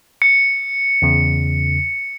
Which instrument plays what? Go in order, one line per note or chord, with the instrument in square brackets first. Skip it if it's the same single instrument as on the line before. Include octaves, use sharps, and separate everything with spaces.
[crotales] C#7
[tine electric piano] E2 C#3